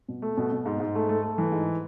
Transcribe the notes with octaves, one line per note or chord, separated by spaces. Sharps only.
B2
A3
B2
B2
G#2
G#2
A3
A3
A3
E3
G#2